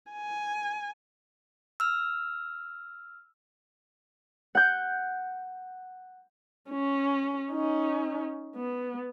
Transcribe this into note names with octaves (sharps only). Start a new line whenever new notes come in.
G#5
E6 F6
F#5 G6
C#4
C#4 D#4
B3